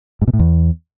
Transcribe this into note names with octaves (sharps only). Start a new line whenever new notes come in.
G#2
B2
A2
E2